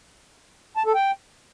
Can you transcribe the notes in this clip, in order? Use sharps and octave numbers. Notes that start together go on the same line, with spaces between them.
A5
A4
G5